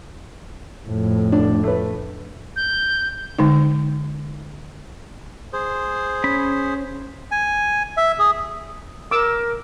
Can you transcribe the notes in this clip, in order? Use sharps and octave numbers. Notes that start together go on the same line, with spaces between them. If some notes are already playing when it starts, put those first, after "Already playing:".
F2 A2
D4
A3 B4
G6
D3 G#3 D#4
G#4 C5
C#4 B5
G#5
E5
G#4
A#4 D6 E6